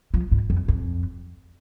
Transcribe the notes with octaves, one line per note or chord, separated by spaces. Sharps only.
F3
G#2
F2
F2